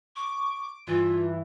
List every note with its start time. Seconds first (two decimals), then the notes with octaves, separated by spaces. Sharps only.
0.16 C#6 D6
0.87 G2 E3 F4